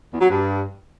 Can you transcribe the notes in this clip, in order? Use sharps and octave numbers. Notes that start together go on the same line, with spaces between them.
E2
F#3
G2